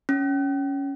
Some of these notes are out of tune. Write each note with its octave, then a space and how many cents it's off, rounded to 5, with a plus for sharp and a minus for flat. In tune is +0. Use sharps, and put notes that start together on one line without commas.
C#4 +10